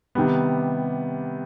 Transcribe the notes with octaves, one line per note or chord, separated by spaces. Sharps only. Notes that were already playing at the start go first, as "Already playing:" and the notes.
C3 D#3 G3 B3